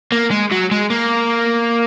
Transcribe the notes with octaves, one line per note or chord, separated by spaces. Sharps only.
A#3
G#3
F#3
G#3
A#3